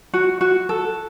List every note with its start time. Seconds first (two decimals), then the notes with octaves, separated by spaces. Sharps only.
0.14 F#4
0.41 F#4
0.69 A4